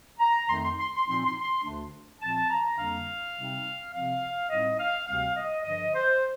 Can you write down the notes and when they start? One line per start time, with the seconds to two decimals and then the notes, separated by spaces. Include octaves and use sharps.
0.19 A#5
0.49 F2 D#3 A3 D#4 C6
0.64 C6
0.79 C6
0.95 C6
1.07 A#2 F3 C4 D#4 C6
1.25 C6
1.40 C6
1.64 D2 D3 A3 D4
2.20 A#2 F3 C4 A5
2.50 A#5
2.78 F2 D3 G3 A#3 D4 F5
3.35 C3 G3 C4 D#4
3.93 C3 F3 C4 F5
4.49 A2 G3 C4 D#4 D#5
4.79 F5
5.07 D2 C3 G3 C4 F5
5.36 D#5
5.64 G2 D3 F3 D#5
5.94 C5